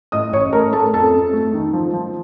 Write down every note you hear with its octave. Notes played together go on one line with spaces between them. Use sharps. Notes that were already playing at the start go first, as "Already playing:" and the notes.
A2 D#5 D#6
A1 C#5 C#6
A3 A#4 A#5
A3 A4 A5
F2 A4 A5
F2
A3
D#3
F3
F3